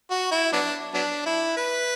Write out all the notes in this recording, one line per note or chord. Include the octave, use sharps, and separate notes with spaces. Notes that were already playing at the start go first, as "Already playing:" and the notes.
F#4
E4
F#3 B3 D4
F#3 B3 D4
E4
B4